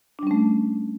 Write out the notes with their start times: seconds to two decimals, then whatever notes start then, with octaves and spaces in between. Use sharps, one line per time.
0.19 D4
0.23 G3
0.27 C#4
0.31 A3